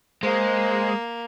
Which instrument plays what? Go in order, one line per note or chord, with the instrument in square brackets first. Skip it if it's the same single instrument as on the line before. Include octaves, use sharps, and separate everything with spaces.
[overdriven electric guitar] G#3 [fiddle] A#3 [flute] C5